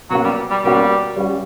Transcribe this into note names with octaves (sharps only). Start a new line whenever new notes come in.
B2 F#3 A#3 C#4 F#4
G3
G3
B2 G3 A#3 C#4 F#4
G3 C#4 F#4